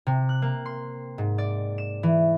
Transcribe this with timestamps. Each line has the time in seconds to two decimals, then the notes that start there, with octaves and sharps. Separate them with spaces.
0.07 C3
0.29 F#6
0.42 A#3
0.66 C6
1.18 G#2
1.38 D5
1.78 E7
2.03 E3